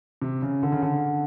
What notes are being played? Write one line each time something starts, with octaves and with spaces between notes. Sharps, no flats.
C3
C#3
D3
C#3
D3